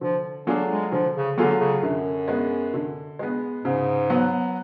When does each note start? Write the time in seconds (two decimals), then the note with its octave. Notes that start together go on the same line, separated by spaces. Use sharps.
0.01 D3 F3
0.47 F#3 A3 D4 F4 G#4
0.70 G#3
0.92 D3 F3
1.15 C#3
1.37 D3 F#3 A3 F4 G#4
1.60 C#3
1.83 F#2 D3
2.28 G#3 B3
2.74 D3
3.19 G#3 B3
3.65 G#2 C#3
4.10 F#3 B3